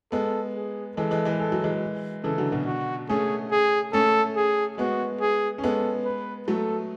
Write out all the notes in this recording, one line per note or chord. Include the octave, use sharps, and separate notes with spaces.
G#3 B3 A4
G#4
E3 G#3 A4
E3 G#3
E3 G#3
G#3 A4
F#3
E3 G#3
C#3 E3 A4
D3 F#3
B2 D3
F#4
A3 C#4 G#4
G#4
A3 C#4 A4
G#4
G#3 B3 F#4
G#4
C#4
G#3 B3 A4
B4
F#3 A3 A4